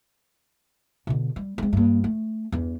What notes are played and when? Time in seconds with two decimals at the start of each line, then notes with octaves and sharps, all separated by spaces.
1.07 B2 D3
1.36 G3
1.58 G#3 C4
1.73 G2 A#3
2.04 A3
2.52 E2 G2